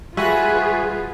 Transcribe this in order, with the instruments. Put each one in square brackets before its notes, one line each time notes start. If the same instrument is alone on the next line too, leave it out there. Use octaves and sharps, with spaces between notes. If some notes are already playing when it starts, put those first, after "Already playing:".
[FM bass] G3 [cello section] F4 G#4 B4 [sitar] F#4 [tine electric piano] E5 G#5 B5